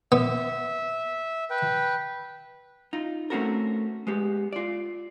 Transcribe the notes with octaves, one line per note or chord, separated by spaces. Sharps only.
B3 E5
B4 G5
D#4 F4
A3 C4 C#4 F#4 A4 A#4
G#3 B3 G4
F4 D5